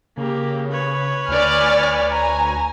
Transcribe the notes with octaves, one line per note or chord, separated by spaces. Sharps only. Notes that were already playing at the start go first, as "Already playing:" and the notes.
C#3 A#3 G4
B4 C#5
D2 D5 G#5 F6
G#5 A#5